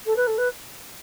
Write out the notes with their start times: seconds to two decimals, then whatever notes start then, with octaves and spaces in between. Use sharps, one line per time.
0.06 A4
0.16 B4
0.27 A4
0.38 B4